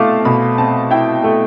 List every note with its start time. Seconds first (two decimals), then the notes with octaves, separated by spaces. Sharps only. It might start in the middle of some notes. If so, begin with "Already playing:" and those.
Already playing: B2 A3 C4 E4 F5 A5 D6
0.25 B2 B5
0.58 C4 A5
0.91 E4 G5
1.24 A3 A4